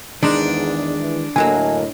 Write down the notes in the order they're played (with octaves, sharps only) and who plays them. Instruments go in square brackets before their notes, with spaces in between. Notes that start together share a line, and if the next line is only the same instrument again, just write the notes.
[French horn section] E2 G#2 [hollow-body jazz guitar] D#3 G#3 [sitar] D4
[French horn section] E3
[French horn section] A2 D#5 [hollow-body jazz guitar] D3 F#3 A#3 [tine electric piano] G#5